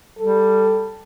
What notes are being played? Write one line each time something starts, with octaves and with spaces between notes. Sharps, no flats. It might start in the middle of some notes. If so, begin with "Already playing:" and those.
G3 A4